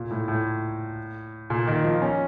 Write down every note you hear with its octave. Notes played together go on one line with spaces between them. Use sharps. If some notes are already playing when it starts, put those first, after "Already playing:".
Already playing: A#2
A2
A2
A#2
D#3
F3
C#4